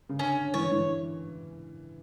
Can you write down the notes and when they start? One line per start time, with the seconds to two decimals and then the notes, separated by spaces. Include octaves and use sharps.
0.09 C#3
0.19 D3 C#4
0.37 D3
0.54 E3 C#5
0.72 E3